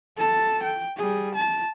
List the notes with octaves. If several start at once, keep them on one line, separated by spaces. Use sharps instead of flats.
A4 A5
G5
G3 G#4
A5